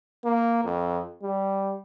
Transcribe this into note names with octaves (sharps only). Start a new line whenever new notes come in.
A#3
F2
G3